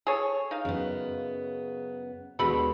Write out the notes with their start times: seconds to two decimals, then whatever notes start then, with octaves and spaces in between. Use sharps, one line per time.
0.07 G#4 A4 C#5
0.51 D#4 F5
0.65 F#2 C#3 B3
2.39 D#2 B2 D3 G#3 A3 A4 B5